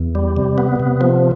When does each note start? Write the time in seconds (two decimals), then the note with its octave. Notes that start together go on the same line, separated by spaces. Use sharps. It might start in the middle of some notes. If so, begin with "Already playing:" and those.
Already playing: E2
0.15 G3
0.37 C3
0.58 B3
0.80 C3
1.01 F3